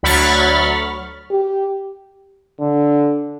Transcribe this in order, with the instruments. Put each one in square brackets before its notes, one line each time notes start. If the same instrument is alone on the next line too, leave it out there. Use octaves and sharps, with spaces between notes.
[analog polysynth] D2 F#3 B5 C#6 F6 A6
[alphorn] G4
[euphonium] D3